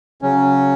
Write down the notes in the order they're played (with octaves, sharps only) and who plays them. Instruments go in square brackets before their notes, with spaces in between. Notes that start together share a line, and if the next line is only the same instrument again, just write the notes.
[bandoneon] C#3 F#3 C#4